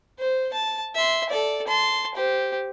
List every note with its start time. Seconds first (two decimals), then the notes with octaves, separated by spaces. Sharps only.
0.19 C5
0.53 A5
0.95 E5 C6
1.30 A4 D5
1.67 A5 C6
2.15 G4 C5